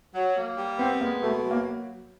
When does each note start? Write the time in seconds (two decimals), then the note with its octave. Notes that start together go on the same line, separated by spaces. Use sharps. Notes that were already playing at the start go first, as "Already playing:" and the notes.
0.14 F#3
0.36 A#3
0.57 G3
0.79 B3 C4
1.00 G#3 A#3
1.22 B2 A3
1.44 F#3
1.51 A#3